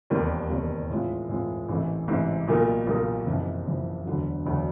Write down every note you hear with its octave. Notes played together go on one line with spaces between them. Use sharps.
E1 D#2 D#3 G3 C4
E1 D#2 D#3 G3 C4
A2 E3 G#3 C4 F4
A2 E3 G#3 C4 F4
A1 G#2 E3 A3 C4
A1 G#2 E3 A3 C4
B1 A#2 G3 A#3 D#4
B1 A#2 G3 A#3 D#4
F#1 F2 C3 E3
F#1 F2 C3 E3
E1 D2 D3 F#3
E1 D2 D3 F#3